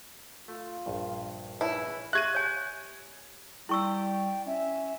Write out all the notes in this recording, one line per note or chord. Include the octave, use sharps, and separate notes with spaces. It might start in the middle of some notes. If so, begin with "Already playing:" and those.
A3 F4
A#1 G2
C#4 E4 B4
G4 E5 F#6 G#6 D#7
C#5 G#5
G3 E4 G5 C#6 E6
C#4 E5